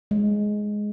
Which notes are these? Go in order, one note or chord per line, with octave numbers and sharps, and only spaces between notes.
G#3